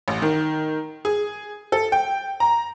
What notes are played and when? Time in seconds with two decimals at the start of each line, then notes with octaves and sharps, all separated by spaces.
0.08 A1
0.22 D#3
1.05 G#4
1.72 A4
1.92 G5
2.40 A#5